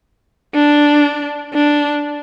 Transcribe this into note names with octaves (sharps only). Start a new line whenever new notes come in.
D4
D4